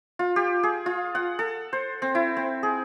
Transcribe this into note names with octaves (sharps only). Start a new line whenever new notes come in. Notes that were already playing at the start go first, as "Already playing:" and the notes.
F4
G4
G#4
F4
F#5
A4
C5
C4
E4
C4
G#4